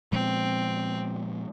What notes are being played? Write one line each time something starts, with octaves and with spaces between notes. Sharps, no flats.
A#2 F3 G#3 B3 C4